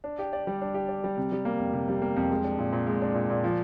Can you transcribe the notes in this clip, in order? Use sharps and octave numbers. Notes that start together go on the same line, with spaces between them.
D4
G4
D5
G3
D4
G4
D5
G3
C3
G3
A#3
F2
C3
G3
A#3
F2
G#3
D4
A#2
A#2
G#3
D4
A#2
A#2
F3